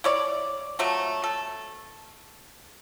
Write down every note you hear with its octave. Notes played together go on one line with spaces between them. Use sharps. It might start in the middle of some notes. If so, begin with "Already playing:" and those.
E4 C#5 D5
F3 F#3 A3
A4